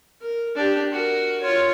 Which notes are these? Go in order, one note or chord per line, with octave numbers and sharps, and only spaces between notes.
A#4
D4 G4
F#4 A#4
F4 C#5